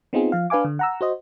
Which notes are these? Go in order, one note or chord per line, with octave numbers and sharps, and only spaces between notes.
B3 C4 D#4 F4 G#4
F3 F5
D4 B4 F5 G#5 D6
D3
F#5 A#5 E6
F#4 C5 D#5